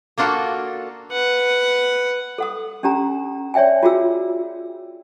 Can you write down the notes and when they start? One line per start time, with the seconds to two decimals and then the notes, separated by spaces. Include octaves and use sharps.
0.18 A#3 D4 F4 F#4 A4
1.12 B4 F#5
2.38 A4 F#5 D#6
2.83 C#4 D4 G4 G#5 A#5
3.54 C#5 D5 E5 G5 G#5
3.83 F4 F#4 G#4 E6